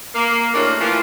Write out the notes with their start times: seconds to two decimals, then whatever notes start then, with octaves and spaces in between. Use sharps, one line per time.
0.15 A#3
0.54 A2 G#3 A#3 C#4 D4 F#4
0.80 E3 F3 A3 A#3 F4